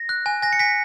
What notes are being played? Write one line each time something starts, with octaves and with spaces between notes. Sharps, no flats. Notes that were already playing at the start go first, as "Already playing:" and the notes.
Already playing: A#6
F#6
G#5
G#5 A#6
C#7
G#5 B6